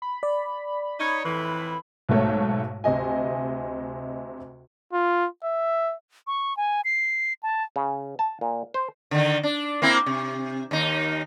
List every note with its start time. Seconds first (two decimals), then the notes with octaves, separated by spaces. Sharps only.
0.02 B5
0.23 D5
0.99 D#4 C#5
1.24 F2 A2 E3
2.09 B1 G#2 A3 C#5
2.84 D2 C3 D#5 G#5
4.93 F4
5.44 E5
6.27 C#6
6.57 G#5
6.85 C7
7.43 A5
7.76 C#3
8.19 A5
8.41 A#2
8.74 C5
9.11 D3 D#3
9.43 D4
9.82 A#3 C4 E4
10.06 C3
10.71 D#2 D#4